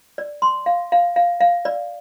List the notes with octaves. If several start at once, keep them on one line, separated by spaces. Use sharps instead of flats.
D5
C6
F5
F5
F5
F5
D5